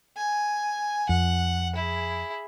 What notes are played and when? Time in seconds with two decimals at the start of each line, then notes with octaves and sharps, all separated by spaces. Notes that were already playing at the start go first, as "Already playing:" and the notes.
0.17 G#5
1.09 F2 F#5
1.76 E4 G#4